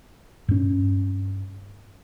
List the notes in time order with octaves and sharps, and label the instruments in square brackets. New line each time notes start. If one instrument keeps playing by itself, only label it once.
[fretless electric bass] G2 C#4